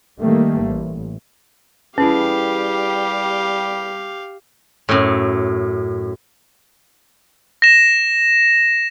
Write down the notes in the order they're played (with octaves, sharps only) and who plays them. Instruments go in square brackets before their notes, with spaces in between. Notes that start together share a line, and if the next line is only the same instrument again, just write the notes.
[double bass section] D#3 G3 A3 A#3
A1
[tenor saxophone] G3 [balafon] C#4 [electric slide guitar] E4 G#4 B4 [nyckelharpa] G4 F5
[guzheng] F#2 A2
[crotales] A#6 E7